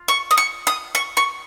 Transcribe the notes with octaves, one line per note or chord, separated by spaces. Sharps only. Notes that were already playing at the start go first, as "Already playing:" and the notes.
Already playing: F4
C#6
D#6
C#6
D#6
C#6
C#6